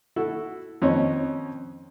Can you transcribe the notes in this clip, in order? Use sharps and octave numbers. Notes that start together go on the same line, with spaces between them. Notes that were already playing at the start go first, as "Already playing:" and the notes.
E4 F#4 A4
F2 D#3 C#4 C#5 D#5